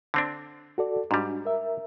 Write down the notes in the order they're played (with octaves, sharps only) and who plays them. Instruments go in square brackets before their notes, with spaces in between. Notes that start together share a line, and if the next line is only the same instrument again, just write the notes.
[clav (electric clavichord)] D3 C4 D4
[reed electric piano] F#4 A4 D5
[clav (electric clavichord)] G#2 G3 [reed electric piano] D4 F#4
[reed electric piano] A#4 E5